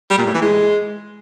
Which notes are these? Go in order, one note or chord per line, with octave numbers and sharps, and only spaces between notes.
G3
A#2
A2
E3
G#3